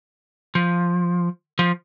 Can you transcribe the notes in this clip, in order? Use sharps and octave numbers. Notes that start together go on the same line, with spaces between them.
F3
F3